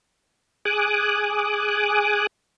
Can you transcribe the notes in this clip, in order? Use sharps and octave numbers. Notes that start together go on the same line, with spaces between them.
G#4 G#5 D6 D#6 F#6